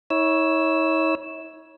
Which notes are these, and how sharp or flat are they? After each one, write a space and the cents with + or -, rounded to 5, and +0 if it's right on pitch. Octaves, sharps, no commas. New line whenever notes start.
E4 -45 C#5 +0 E6 +0